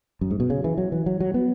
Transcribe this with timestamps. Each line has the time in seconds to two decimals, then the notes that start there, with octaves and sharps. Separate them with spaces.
0.21 F#2
0.31 G#2
0.40 B2
0.50 C#3
0.64 E3
0.78 F#3
0.92 E3
1.06 F#3
1.20 F#3
1.34 B3